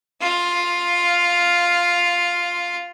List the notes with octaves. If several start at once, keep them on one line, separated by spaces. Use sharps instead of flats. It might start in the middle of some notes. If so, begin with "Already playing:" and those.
F4 F6